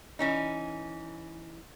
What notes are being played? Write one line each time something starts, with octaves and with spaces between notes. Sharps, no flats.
E3 C#4 D#4